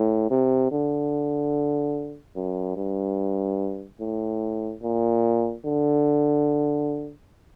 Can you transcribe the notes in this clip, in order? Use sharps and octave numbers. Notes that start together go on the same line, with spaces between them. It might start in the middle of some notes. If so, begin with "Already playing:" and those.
Already playing: A2
C3
D3
F#2
G2
A2
A#2
D3